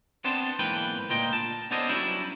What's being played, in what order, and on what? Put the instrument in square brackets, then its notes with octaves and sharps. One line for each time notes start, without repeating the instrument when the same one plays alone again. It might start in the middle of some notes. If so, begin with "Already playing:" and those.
[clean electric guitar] B3 C4 D4 C5 D5 A5
B1 G#2 E3 A#3 B4 G5
D2 A#2 A#3 F4 D#5 G5
A5
B3 C#4 D4 A4 C5 D#5
F#3 G3 C#4 D4 E4